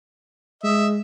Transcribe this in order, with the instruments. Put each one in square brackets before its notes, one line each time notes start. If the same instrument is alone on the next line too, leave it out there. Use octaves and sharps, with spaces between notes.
[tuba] G#3 [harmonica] D#5 E5